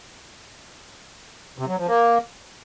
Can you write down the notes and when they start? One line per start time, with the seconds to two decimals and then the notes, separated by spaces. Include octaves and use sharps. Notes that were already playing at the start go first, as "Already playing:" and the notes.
1.58 C3
1.68 F#3
1.77 F3
1.87 A#3